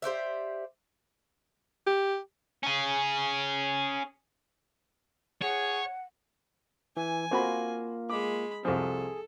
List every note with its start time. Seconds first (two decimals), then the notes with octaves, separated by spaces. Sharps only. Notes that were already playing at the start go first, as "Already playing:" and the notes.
0.02 G4 C5 D5 E5
1.87 G4
2.63 C#4 G#4
5.42 G#4 C#5 F#5
6.97 E3 G#5
7.31 A#3 C4 F4 F#4 B5
8.10 G#3 B5 D6
8.65 C2 F3 G#4 A4